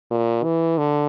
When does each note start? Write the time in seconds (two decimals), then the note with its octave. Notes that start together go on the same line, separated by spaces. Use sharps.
0.11 A#2
0.44 E3
0.78 D3